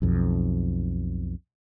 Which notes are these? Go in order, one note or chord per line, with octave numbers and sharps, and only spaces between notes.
B1 F2